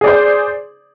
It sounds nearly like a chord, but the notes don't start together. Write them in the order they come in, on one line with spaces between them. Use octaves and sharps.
G#4 D5 C5